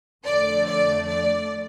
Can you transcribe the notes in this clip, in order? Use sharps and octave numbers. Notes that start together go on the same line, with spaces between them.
F2 D3 A3 D5
D5
D5